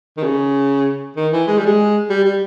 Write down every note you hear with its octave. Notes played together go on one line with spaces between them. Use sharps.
D#3
C#3
D#3
E3
G#3
G3
G#3
G3
G3